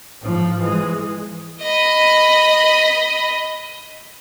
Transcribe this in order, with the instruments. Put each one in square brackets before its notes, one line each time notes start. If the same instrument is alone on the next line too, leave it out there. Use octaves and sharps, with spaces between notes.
[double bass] G#2 F3
E3 G#3
[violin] D#5 B5